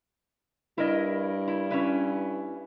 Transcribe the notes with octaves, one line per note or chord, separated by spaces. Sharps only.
G2 E4 A#4 D#5
E4
C#4 E4 B4